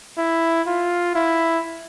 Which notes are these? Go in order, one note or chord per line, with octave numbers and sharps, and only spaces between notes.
E4
F4
E4